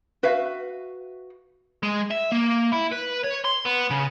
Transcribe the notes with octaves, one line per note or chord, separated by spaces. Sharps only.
F#4 B4 E5 F5
G#3
E5
A#3
E4
B4
C#5
C6
B3
C#3